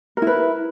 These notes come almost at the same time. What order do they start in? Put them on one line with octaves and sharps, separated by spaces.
A#4 E4 B4